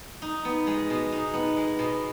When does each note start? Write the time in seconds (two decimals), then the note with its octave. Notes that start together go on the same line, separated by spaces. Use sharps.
0.22 D#4
0.45 B3
0.67 G#3
0.90 B2
1.12 D#4
1.34 B3
1.57 G#3
1.79 B2